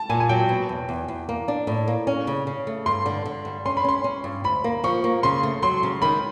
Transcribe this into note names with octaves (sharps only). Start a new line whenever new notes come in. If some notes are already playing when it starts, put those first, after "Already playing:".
Already playing: A5
A#2 G#5
G#5
F#3 G5
B2
E2
E2
E2
A#3
D4
A2
A#3
C#4
C#3
C#3
A3
G2 C6
D3
D3
G2
C#4 C6
B5
C#4 C6
C#4
G2
D2 B5
A#3
F3 C#6
A#3
C#3 C6
A3
F#3 C6
C#3
D#3 B5